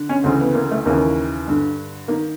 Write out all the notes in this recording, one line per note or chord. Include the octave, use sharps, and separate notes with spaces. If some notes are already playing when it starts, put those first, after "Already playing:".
Already playing: D3
C#4
D2 C#3 E3 C4
B3
A#3
A3
D#2 C#3 E3 A#3
G2 D3
D#3 A#3